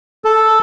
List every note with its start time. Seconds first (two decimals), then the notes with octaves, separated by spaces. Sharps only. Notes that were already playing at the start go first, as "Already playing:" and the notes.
0.25 A4